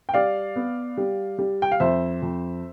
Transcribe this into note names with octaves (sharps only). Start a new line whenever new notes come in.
G5
G3 D5 F5
B3
G3
G3
G5
F5
F2 C5 E5
F2